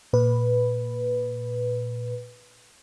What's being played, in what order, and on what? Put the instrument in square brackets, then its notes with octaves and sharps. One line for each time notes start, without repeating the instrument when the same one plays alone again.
[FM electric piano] A#2 B4